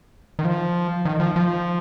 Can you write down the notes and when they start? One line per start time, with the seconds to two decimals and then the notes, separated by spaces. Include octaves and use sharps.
0.39 D#3
0.45 F3
1.05 D#3
1.20 F3
1.36 F3